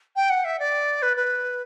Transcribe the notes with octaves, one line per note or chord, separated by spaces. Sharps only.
G5
F#5
E5
D5
B4
B4